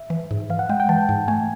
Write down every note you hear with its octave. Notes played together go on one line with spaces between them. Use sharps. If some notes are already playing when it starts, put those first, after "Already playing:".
Already playing: E5
E3
G#2
E3 F5
F#5
G#3 G5
G5
E3 A5
G#2
A3 G#5